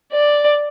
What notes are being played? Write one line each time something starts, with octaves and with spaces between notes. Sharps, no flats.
D5